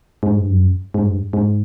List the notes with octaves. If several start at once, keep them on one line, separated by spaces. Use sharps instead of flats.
G#2
G2
F#2
G#2
G2
G#2